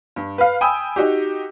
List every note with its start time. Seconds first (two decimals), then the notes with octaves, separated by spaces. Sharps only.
0.16 G2
0.38 B4 F5
0.61 G5 G#5 B5 D#6 E6
0.96 D#4 F#4 G4